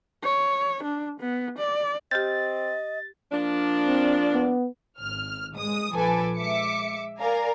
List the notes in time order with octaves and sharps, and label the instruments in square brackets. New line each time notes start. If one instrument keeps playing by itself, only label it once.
[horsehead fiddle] C#5
D4
B3
D5
[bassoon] C4 [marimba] G4 F6 G6 [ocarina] D#5 [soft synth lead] A6
[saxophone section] F3 A#3 D4
[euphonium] C4
B3
[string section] G#1 F6
G#3 D#6
A#1 F3 A4 B4 G#5 D6
G#3 E5 D6 C#7
A#4 D5 F5 G#5 A#5